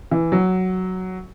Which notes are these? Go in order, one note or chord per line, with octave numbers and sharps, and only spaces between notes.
E3
F#3